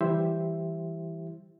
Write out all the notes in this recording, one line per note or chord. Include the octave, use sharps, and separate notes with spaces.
E3 G3 E4 G4 C5 E5